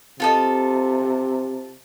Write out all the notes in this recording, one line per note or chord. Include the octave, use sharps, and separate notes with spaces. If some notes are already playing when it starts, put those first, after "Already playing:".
C3 F4 A4 D#5